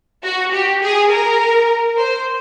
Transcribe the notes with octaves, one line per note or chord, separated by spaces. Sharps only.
F#4
G4
G#4
A#4
C5